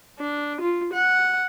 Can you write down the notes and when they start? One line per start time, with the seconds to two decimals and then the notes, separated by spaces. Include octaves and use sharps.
0.19 D4
0.60 F4
0.93 F#5